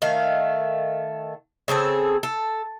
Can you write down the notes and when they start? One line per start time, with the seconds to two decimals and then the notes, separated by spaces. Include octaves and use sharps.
0.02 D#3 A3 F5
1.68 C#3 C4 G#4 A4
2.23 A4